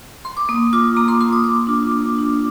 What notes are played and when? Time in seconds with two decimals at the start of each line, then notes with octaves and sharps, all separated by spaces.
0.25 C6
0.37 D6
0.49 A#3 D#6
0.73 F4 D6
0.96 A#3 A#5
1.08 C6
1.20 F4 C6
1.33 D#6
1.43 A#3 D6
1.67 D4 F4
1.91 A#3
2.15 D4 F4